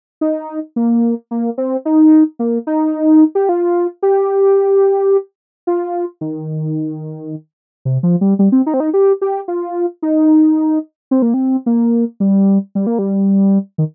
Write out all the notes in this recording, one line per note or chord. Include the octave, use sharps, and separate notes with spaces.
D#4
A#3
A#3
C4
D#4
A#3
D#4
G4
F4
G4
F4
D#3
C3
F3
G3
G3
C4
D#4
C4
D#4
G4
G4
F4
D#4
C4
A#3
C4
A#3
G3
G3
A#3
G3
D#3